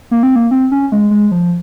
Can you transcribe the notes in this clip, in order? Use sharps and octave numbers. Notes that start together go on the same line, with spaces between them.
A#3
C4
A#3
C4
C#4
G#3
G#3
F3